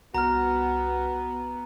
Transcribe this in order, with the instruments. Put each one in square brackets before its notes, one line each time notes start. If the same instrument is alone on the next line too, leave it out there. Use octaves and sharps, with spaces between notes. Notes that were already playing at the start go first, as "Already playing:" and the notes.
[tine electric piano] C2 F6 [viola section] B3 [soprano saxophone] F#4 [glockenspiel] A#5